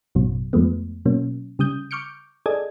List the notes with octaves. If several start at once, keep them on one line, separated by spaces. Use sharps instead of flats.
A1 F#2 B2 F#3
F2 F3 G#3 A3 B3
B2 F#3 A#3 C#4
C#3 G3 D#6 G6
C#6 D6 F6 G6 C#7 D7
G#4 A4 D5 D#5 G#6